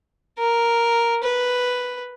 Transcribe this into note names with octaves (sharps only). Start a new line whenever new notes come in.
A#4
B4